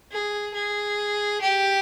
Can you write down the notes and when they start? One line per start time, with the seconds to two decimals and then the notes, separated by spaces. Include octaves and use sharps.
0.12 G#4
0.54 G#4
1.41 G4